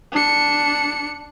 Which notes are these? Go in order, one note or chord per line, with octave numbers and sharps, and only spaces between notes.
D4 C#7